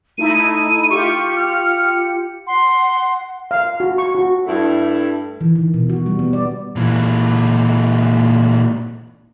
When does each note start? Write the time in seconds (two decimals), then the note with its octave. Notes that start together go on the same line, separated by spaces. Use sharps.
0.18 A3 D#4 E4 D#7
0.90 F4 G4 C#6 C#7
1.36 F6
2.47 F#5 C6
3.51 F5
3.80 F#4
3.98 C#6
4.15 F#4
4.46 G2 A3 E4
5.41 E3
5.55 D#3
5.74 B2
5.89 F#4
6.06 G3
6.19 B3
6.33 D5
6.76 A#2 E3